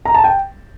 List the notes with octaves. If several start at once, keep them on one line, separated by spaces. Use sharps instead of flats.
A#5
A5
G5